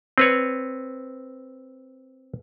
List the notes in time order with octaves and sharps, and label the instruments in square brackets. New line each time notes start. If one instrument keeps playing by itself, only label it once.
[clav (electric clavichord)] C4 B4 C#5